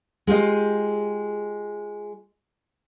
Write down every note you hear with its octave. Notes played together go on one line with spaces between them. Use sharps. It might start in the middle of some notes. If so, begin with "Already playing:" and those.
G#3 F4 G4 D#5